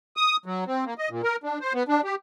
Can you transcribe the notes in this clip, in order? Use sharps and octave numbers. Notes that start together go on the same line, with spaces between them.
D#6
F#3
C4
A#3
D#5
A#2
A#4
D4
C5
B3
D4
G4